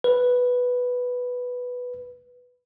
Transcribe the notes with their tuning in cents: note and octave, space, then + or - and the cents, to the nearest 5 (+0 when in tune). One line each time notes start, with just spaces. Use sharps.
B4 +0